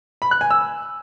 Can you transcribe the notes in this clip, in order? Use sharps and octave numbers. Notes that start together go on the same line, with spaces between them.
B5
F#6
G#5
E6